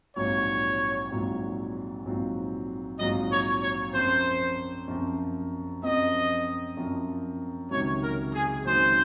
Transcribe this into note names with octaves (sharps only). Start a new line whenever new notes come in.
A#1 G#2 F#3 C4 F4 C#5
A#1 G#2 F#3 C4 F4
A#1 G#2 F#3 C4 F4
A#1 G#2 F#3 C4 F4 D#5
C#5
C#5
F#2 F3 C4 C5
F#2 F3 C4
F#2 F3 C4 D#5
F#2 F3 C4
C#2 C3 D#3 F#3 C#5
A#4
G#4
C#2 C3 D#3 F#3 C5